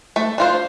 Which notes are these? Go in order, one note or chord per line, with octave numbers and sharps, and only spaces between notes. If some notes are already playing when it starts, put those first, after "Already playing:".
A3
D4 F4 C5